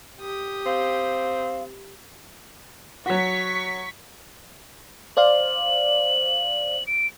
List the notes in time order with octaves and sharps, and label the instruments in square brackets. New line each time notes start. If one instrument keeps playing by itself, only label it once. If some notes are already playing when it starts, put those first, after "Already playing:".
[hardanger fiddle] G4 D#6
[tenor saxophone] C4 [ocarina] F5
[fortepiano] F#3 F#4 [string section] C#6 B6
[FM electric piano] C5 D5 F5 [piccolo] F#7
[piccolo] D7